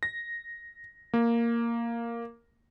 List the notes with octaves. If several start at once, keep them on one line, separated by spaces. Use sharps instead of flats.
A#6
A#3